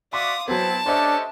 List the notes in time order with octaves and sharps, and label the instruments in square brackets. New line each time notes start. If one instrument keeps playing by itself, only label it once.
[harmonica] F#4 D5 E5 [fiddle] F5 D#6 [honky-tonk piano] C6 D6
[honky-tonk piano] F#3 B3 [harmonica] C4 E4 [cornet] C5 [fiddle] A5
[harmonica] A3 C#4 G4 [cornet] D4 [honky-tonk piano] C5 D#5 E5